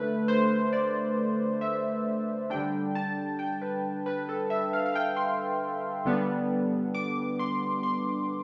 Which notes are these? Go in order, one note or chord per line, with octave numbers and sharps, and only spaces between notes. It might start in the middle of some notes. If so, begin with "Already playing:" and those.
Already playing: D3 A3 B4
C5
D5
E5
D3 G3 D4 G5
A5
G5
B4
B4
A4
E5
F5
F5
G5
C6
D3 G3 B3 D4
D6
C6
C6